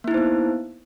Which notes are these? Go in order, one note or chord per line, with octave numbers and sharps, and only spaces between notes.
A#3 B3 D#4 E4 C5